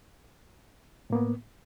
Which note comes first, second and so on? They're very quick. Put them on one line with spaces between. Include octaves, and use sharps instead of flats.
A2 A#3 B3